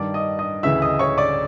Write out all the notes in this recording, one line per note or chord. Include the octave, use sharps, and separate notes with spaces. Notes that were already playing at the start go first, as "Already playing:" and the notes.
Already playing: G2 D#3 D5 D6
D#5 D#6
D#5 D#6
D2 C#3 E3 E5 E6
D#5 D#6
C#5 C#6
D5 D6